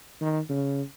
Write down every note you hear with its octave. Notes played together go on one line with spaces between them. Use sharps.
D#3
C#3